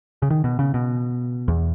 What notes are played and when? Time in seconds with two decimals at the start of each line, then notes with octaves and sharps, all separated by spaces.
0.22 C#3
0.30 D#3
0.44 B2
0.59 C#3
0.74 B2
1.48 E2